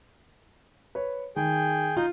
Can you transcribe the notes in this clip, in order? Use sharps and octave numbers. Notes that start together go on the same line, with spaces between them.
B4 C#5
D#3 G#4 G5
D#4 F4 G6